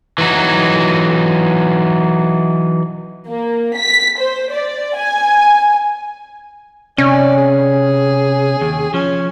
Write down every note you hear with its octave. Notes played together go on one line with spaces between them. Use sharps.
E3 F#3 D#4
A#3
B6
C5
D5
G#5
C3 C#4 D5
G#4
D#2
F3 C#4